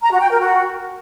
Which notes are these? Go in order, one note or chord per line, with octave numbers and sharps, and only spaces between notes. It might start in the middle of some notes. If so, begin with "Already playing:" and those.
A#5
F#4
G5
A#4
F#4